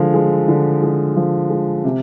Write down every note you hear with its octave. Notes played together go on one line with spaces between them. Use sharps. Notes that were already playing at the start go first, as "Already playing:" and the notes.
Already playing: D3 F3 G#3
G#3
D3
G#3
F3
G#3
C3